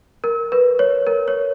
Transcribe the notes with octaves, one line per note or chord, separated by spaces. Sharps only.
A#4
B4
C#5
A#4
C#5